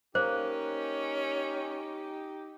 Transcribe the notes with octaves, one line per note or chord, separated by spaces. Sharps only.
A#3 C#4 D#4 G4 C5